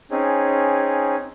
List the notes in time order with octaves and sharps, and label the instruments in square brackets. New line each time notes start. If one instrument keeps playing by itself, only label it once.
[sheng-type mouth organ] C4 C#4 D#4 G#4